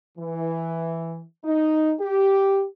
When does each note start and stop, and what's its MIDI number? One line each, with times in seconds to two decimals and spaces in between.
0.18 1.22 52
1.45 1.93 63
1.99 2.65 67